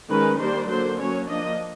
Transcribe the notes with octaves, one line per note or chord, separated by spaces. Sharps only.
D#3 G#3 C#4 B4
D#3 G3 A#3 D4 C5
D3 F#3 A#3 C5
F#3 A#3 C#4 C#5
F3 A#3 D4 D#5